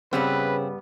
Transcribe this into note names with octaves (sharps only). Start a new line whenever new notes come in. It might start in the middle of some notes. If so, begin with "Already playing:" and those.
G2 C#3 G3 B3 C4 B4